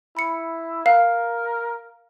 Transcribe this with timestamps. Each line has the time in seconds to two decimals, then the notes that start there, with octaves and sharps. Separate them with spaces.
0.17 E4 B5 C#7
0.86 A#4 F5